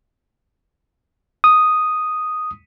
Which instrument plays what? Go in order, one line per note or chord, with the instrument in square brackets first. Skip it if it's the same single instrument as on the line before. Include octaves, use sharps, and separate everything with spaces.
[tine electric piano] D#6